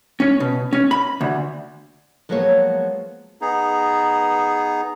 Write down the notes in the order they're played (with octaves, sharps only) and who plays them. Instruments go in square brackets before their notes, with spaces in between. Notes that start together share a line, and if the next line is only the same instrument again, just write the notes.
[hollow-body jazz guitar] C#4
B2
C#4
B5
D2
[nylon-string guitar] F3 F#3 G#3 A#3 B3 C#5
[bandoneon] B3 D#4 G#4